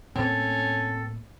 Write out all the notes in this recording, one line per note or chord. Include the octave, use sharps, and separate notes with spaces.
A2 A#3 C4 C#4 A4